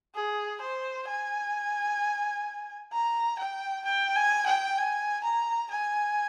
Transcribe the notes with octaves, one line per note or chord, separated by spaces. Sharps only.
G#4
C5
G#5
A#5
G5
G5
G#5
G5
G#5
A#5
G#5